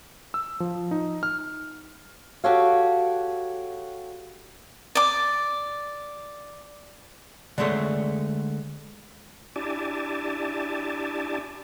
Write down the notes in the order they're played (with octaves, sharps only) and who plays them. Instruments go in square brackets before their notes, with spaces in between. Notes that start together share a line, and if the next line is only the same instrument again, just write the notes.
[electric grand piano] E6
F3
D#4
F6
[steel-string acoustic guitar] F#4 G4 A4 C#5 F5
[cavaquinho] D5 D6
[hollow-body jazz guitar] D3 G#3 A3 C#5
[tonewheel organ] D4 E4 G4 D5 G#5 A5